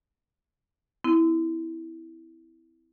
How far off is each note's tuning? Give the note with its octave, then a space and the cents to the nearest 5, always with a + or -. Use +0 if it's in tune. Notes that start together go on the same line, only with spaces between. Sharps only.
C4 -35 E4 -10